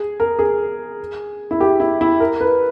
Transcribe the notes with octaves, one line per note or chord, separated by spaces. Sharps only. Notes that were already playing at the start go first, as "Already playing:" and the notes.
Already playing: G#4
A#4
G#4
E4
G4
E4
E4
A#4
B4